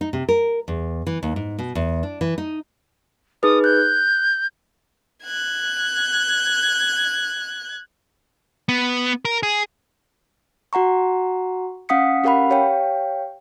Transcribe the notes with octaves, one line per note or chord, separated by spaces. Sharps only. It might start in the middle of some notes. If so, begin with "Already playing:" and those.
D#4
C3
A#4
E2
E3
D#2
G#2
B2
E2
D4
E3
D#4
D#4 G#4 B4 D#6
F#6 G6
F#6 G#6
B3
A#4
G#4
F#4 F#5 A#5 C#6
C#4 F5 F#5 D#6 B6 C#7
C#4 G4 A#4 F5 F#5 B5
G4 C#5 F5 G5